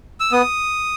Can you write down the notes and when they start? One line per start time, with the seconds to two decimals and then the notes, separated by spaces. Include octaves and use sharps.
0.20 E6
0.32 B3 D#6